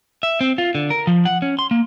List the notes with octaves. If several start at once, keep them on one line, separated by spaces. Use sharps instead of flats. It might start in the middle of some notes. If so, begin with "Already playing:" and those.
E5
C4
F4
D3
A#4
F3
F#5
C#4
C6
A#3